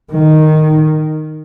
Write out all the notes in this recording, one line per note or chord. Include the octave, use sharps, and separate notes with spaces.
D#3